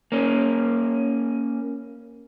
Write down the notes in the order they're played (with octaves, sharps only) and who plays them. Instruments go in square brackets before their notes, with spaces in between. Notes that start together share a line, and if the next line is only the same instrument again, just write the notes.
[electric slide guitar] A#3 C#4